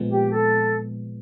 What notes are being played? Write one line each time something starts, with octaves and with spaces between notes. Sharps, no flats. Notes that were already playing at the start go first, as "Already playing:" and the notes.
Already playing: A#2 F3 G#3 B3
G4
A4